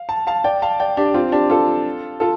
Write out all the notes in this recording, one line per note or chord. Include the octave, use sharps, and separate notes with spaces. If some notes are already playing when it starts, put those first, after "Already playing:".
Already playing: F5
A5
F5 A5
D5 G5
F5 A5
D5 G5
D4 G4
C4 F4
D4 G4
F4 A4
F4 A4